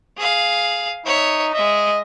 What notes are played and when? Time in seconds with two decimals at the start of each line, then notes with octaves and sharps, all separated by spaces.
0.17 G#4 F5
1.06 D#4 C#5 E5
1.54 G#3 D#5 E5